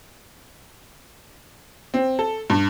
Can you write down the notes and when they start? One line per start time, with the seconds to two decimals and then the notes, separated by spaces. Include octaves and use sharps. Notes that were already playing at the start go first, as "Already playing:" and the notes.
1.94 C4
2.19 A4
2.50 G2